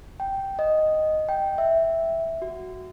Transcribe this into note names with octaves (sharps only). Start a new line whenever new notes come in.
G5
D#5
G5
E5
F#4